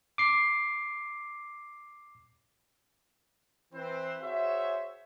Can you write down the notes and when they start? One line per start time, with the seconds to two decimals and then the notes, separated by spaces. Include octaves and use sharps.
0.18 D6 C7
3.73 E3 C4 B4 C5
4.22 F#4 G#4 C5 C#5 E5